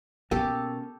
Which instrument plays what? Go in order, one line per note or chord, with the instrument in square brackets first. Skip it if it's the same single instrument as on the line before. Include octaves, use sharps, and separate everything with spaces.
[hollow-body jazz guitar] B2 A#3 [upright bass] C#4 [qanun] G4 A4